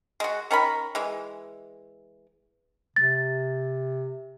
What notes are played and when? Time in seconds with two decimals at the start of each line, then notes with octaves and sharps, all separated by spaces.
0.20 G#3 F#4
0.51 D#3 C#4 A#4 B5
0.95 E3 G#3
2.96 C3 A6